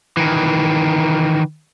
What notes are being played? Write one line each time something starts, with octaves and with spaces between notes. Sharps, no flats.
D#3 E3